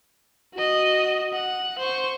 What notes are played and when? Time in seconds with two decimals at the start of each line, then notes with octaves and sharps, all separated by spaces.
0.54 F#4 D#5
1.33 F#5
1.79 C5 C#6